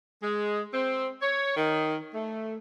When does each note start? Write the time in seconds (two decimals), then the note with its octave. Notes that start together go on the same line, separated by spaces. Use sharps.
0.23 G#3
0.74 C4
1.22 C#5
1.57 D#3
2.14 A3